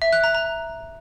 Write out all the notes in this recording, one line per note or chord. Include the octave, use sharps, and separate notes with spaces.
E5
F#6
A#5
A#5